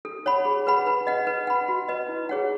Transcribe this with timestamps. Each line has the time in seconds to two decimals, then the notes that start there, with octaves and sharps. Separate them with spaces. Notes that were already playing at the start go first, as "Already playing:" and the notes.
0.05 A4
0.26 C#5 F#5 B5
0.45 G#4
0.67 B4 F#5 B5
0.87 B4
1.07 D#5 F#5
1.27 B4
1.47 F#5 B5
1.68 F#4
1.88 B4 D#5
2.09 E4
2.29 G#4 C#5 F#5